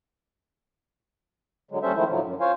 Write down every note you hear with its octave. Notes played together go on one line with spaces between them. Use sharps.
D3 F#3 G#3
D#2 G3 C#4 A4 C5 E5
D#3 F3 G#3 A3 E4 C5
A2 D3 F3 F#3
F#2
F4 C5 C#5 F5 G#5